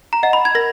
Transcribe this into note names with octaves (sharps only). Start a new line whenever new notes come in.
A#5
D#5 F#5
B5
G#6
A#4 A#6